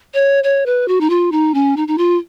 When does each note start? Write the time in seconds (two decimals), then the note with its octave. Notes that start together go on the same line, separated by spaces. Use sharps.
0.14 C#5
0.44 C#5
0.66 B4
0.88 F#4
1.01 D#4
1.10 F4
1.32 D#4
1.54 C#4
1.76 D#4
1.88 D#4
1.98 F4